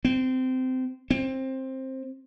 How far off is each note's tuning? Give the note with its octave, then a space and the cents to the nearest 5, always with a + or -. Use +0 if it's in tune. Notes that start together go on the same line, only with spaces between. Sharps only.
C4 -20
C4 +15